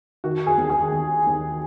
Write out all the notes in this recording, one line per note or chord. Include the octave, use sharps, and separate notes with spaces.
D#3 F#4
G#4
D#2
G#4
D#2
D#2